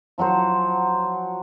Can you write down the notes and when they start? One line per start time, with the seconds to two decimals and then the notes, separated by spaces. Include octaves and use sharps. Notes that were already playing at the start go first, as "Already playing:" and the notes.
0.18 F3 F#3 F#4 C5